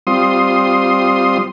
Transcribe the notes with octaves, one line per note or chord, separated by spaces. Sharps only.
G3 C4 F4 C6 D#6